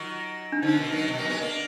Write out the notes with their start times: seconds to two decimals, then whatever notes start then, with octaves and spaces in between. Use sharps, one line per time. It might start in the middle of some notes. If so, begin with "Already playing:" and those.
Already playing: D#3 F#3 F4
0.52 D4
0.62 D3 F3 D#4
0.77 B2 D#3
0.92 D#3 F#3
1.08 B2
1.18 F#3 A#3
1.29 G#3 B3
1.41 A#3 D4